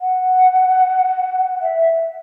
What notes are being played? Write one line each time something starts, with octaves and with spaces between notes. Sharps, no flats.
F#5
E5